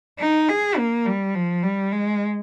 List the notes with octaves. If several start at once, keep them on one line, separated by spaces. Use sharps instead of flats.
D#4
G#4
A#3
G3
F3
G3
G#3